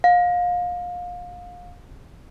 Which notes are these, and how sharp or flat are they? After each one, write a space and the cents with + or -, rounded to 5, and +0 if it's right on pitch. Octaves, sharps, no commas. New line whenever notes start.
F5 +30